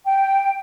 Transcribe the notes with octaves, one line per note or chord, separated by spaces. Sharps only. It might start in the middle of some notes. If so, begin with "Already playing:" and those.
G5